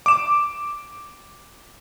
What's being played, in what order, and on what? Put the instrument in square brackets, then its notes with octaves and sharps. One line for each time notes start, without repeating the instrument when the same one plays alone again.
[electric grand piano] D6 E7